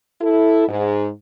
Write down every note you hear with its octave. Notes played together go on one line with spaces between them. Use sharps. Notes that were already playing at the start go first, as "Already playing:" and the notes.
E4 A4
G#2